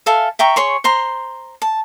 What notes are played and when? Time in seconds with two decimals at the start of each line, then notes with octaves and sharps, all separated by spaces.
0.06 A4 E5 F5 G#5
0.39 E5 G5 A#5 C#6
0.56 G#4 C#5 C6 C#6
0.84 C5 A#5 C6
1.62 A5